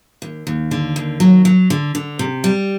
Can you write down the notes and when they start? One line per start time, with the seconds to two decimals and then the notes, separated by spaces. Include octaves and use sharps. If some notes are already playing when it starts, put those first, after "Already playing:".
0.22 D#2
0.47 D#2
0.71 D3
0.96 D#2
1.20 F#3
1.45 F#3
1.70 D3
1.95 D3
2.19 C3
2.44 G3